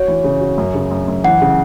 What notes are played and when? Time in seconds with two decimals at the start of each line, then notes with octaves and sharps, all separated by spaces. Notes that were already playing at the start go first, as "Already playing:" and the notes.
Already playing: F#4 C#5
0.08 E3
0.24 C#3
0.41 F#4
0.58 F#2
0.74 C#3
0.91 F#2
1.08 F#2
1.24 E3 F#5
1.42 C#3